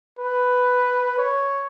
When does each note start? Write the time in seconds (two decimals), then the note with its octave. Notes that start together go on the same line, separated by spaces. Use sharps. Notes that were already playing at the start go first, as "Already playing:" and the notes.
0.19 B4
1.18 C#5